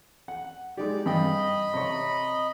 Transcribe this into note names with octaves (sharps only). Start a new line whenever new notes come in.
F#5
G#3 D#4 G4 D5
G2 D#5 G5 B5
C3 C#5